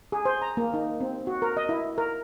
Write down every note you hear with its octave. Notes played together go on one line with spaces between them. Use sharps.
G#4
C5
A#5
A#3
D#4
C4
F#4
A#4
D#5
E4
A#4